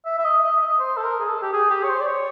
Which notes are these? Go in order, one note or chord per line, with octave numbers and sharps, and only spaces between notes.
E5
E5
D#5
D#5
D#5
C5
A4
A#4
G#4
A4
G4
G#4
G4
C#5
C5
D5
C#5